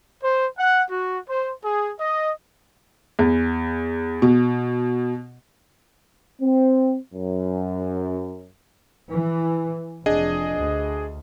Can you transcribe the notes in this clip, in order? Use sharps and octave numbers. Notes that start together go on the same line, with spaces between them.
C5
F#5
F#4
C5
G#4
D#5
E2
B2
C4
F#2
E3
F1 D4 G#4 D#5
D2